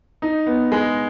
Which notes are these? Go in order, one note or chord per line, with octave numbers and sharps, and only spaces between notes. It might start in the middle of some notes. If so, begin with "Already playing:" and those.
D#4
B3
G#3